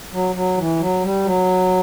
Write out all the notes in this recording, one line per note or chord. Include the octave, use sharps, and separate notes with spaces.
F#3
F#3
E3
F#3
G3
F#3